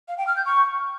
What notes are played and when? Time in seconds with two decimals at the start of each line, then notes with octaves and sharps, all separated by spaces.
0.08 F5
0.18 G5
0.27 F6
0.36 G6
0.46 C#6